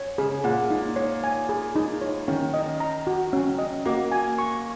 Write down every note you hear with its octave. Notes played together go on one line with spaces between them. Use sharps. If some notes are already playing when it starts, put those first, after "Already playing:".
Already playing: C#5
C#3 G#4
A#2 F#5
D#4
C#5
G#5
G#4
D#4
C#5
D#3 C#4
D#5
A#5
F#4
C#4
D#5
A#3 F#4
G#5
C#6